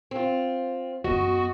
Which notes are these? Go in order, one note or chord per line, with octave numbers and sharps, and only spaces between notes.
C4 F4
F#2 B3 F#4 D#5